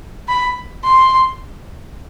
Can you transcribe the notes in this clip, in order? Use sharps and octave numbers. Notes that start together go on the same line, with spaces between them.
B5
C6